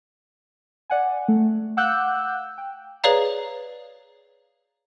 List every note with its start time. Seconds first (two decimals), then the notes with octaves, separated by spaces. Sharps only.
0.90 D5 F#5 G#5
1.28 A3
1.77 F5 F#5 D6 E6 F#6 G6
2.58 G5
3.04 G#4 B4 C#5 D5 F5 A#5